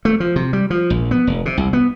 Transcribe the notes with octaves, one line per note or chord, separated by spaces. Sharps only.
A3
F3
C3
G3
F3
A#1
B3
F1
C3
C2
B3